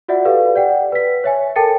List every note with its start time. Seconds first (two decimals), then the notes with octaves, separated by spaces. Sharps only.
0.08 F4 F#4 D5 E5 F#5
0.25 G4 A4 B4 F5
0.56 D5 F#5 G5
0.92 B4 B6
1.24 C#5 E5 G#5
1.56 A4 A#4 G5 A5 A6 C#7